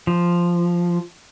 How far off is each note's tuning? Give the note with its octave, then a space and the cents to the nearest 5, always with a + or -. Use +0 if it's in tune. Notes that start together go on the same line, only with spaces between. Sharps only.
F3 -5